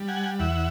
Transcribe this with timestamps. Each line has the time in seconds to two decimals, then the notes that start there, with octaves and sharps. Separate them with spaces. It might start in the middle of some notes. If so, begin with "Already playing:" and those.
Already playing: G3
0.08 F#5 G#5
0.39 E2 E5 F#5